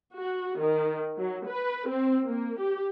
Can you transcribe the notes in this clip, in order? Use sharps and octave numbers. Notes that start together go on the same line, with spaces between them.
F#4
D#3
F#3
B4
C4
A#3
G4